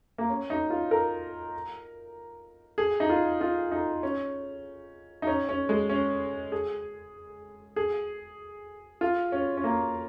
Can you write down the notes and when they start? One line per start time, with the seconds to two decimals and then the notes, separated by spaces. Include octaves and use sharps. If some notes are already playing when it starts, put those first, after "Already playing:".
0.18 A#3
0.30 C#4
0.50 D#4
0.70 F4
0.91 A#4
2.78 G#4
3.00 D#4
3.10 F4
3.41 F4
3.71 D#4
4.03 C#4
5.22 D#4
5.27 C#4
5.49 C#4
5.69 G#3
5.90 C#4
6.52 G#4
7.76 G#4
9.01 F4
9.32 C#4
9.57 C#4
9.64 A#3